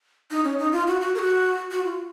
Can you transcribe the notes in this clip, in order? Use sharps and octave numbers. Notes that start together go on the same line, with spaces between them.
D#4
C#4
D#4
F4
F#4
F#4
A#4
F#4
F#4
F4